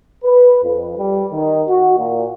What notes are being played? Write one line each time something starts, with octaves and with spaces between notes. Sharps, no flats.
B4
F2
G3
D#3
F#4
A#2